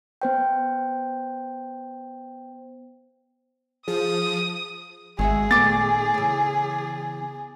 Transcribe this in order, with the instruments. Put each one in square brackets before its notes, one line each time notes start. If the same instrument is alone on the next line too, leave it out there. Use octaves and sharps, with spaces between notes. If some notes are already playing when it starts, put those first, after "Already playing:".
[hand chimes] B3 C5 G5
[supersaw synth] F3 [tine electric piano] G#4 [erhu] D#6
[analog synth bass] G#1 [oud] G#3 F#4 E5 [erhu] G#4
[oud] A#2 D#3 A3 [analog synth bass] B3 [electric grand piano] D6 A6
[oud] C#3 E3